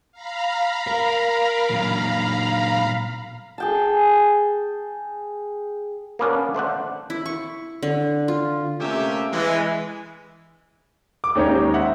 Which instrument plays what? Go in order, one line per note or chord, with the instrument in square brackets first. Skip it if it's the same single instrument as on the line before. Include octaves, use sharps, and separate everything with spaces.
[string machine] F5 A#5 B5
[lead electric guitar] A#4
A#2 F#3
[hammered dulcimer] G#4 G5 A5
[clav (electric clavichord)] A#3 B3 C#4 D4
A3 C5 D5 F#5
[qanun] E4
C#6
D3
F4
[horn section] C3 A3 A#3 C#4 G4 E5
E3 G#3
[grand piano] D6
D#2 G#3 C#4 D#4 G4 C#5
C5 E5 F#5